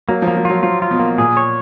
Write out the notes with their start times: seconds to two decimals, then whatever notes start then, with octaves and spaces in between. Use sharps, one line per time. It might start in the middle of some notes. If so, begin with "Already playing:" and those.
0.09 F#3 A#3
0.22 F3
0.28 A#3
0.37 F3
0.45 F#3 F4
0.63 F3 F4
0.82 F4
0.91 B2
0.99 A#3
1.18 A#2 G#4
1.37 C#5